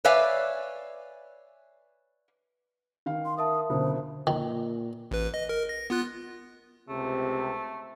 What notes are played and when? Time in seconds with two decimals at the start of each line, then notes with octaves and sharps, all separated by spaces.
0.05 B4 C#5 D5 E5 F5 G#5
3.06 D#3 F5
3.25 C6
3.38 A#4 E5 A5 D#6
3.70 F#1 D2 B2 C5
4.27 A#2 D#3
5.11 A1 B4
5.34 D#5
5.49 A#4
5.69 A#6
5.90 B3 F4 F#6
6.89 C#2 C3 A3